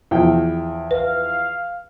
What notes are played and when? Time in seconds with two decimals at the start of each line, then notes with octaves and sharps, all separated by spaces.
0.11 E2 F3 G5
0.91 B4 F5